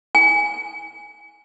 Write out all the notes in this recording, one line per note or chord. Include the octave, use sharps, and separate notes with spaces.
G#5